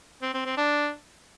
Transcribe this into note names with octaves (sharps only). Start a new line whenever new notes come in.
C4
C4
C4
D4